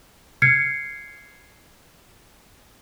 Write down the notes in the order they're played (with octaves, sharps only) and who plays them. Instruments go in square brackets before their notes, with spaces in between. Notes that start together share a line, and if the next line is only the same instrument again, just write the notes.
[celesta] F6 G#6 C7 C#7